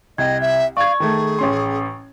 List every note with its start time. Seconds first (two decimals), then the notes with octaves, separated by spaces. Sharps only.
0.18 C2 D#5 G5 G#6
0.41 E5
0.77 D5 F5 C#6 G#6
1.00 D#3 A3 G#4
1.39 A1 C#4 C6